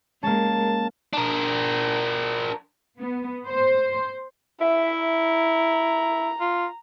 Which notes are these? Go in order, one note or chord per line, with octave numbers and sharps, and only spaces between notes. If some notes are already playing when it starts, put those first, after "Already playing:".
G#3 A#3 C#4 A5
D4 A#4
B3
C5
E4 E5
A#5
F4